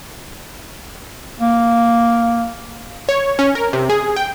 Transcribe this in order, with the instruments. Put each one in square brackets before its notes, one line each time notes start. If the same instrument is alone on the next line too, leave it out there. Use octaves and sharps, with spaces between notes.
[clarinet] A#3
[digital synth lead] C#5
C#4
A#4
C3
G#4
G5